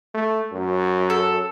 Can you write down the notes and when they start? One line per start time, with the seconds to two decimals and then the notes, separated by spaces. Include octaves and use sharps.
0.14 A3
0.52 F#2
1.10 A4